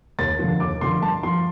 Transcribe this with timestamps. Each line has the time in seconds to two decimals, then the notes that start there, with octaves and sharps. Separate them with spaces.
0.19 D#2 A6
0.39 D3 F3
0.60 D#2 D6
0.81 D3 F3 C6
1.02 G2 A5
1.23 F3 C6